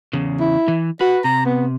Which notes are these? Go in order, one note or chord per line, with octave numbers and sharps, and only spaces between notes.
E2 C#3
E4
E3
F#4 B4
C3 A#5
B3